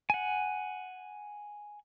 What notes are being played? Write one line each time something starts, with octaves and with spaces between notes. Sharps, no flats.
F#5 G#5